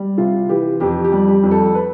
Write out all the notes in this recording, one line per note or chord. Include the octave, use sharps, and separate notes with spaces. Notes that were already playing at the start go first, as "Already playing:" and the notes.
Already playing: G3
C3 F4
E3 G4
F2 G4
G4
G3
G4
F2
A4
B4